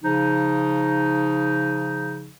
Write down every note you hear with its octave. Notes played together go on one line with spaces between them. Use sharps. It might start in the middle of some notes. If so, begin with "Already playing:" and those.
C#3 F3 D#4